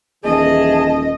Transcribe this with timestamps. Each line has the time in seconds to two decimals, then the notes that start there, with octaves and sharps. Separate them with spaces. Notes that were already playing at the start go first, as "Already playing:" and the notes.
0.24 D#1 E3 G#4 D#5 A5